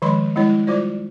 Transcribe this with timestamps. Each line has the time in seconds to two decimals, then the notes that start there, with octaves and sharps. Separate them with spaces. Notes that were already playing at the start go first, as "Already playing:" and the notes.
0.02 D#3 F3 G#3 B5 C6
0.36 G3 G#3 B3 E4 C#5
0.67 G3 F4 C5 D5